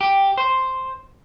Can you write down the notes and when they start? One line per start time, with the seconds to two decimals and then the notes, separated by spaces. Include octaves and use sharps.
0.01 G4
0.38 C5